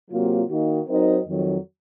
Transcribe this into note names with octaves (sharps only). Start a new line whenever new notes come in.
C3 F#3 A#3 F4
D#3 A#3 D#4 F#4
F#3 C4 D#4 A#4 D#5
F2 D#3 F#3